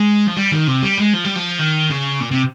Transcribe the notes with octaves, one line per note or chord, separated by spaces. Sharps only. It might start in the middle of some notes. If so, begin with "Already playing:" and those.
Already playing: G#3
F3
G3
D#3
C3
G3
G#3
F3
G3
F3
D#3
C#3
A#2
C3